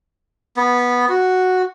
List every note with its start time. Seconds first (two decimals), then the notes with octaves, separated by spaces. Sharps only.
0.57 B3
1.09 F#4